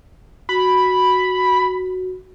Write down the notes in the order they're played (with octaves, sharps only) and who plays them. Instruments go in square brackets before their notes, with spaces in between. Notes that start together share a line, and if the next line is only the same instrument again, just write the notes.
[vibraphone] F#4 [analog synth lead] B5